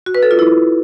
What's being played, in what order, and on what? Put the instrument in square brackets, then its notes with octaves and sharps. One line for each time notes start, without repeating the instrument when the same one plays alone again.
[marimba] F#4
B4
A4
F4
E4